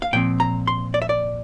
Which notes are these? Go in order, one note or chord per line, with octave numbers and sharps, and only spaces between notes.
F5
A#2 F3 C4 G5
A#5
C6
D5
E5
D5